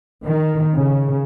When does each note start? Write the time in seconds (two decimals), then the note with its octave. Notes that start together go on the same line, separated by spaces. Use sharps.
0.24 D#3
0.74 C#3